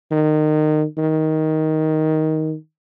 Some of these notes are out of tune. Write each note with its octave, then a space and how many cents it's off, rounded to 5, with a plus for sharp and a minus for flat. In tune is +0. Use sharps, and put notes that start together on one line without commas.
D#3 -25
D#3 +10